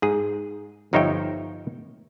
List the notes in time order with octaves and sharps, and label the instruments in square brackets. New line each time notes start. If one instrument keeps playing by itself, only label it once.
[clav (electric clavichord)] G#2 G#4
G1 F3 D#4 C#5 E5 G5